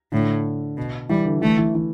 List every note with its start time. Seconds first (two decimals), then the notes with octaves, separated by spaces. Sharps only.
0.12 A2 D3
0.77 B2
1.09 E3 G3
1.25 D3
1.41 E3 A3
1.58 E3
1.75 E3